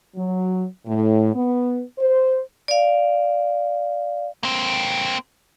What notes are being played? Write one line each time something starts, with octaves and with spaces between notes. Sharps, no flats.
F#3
A2
B3
C5
D5 F5
A#3 C4